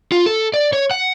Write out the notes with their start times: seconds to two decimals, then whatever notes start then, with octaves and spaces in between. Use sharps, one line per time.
0.12 F4
0.26 A4
0.54 D5
0.73 C#5
0.91 F#5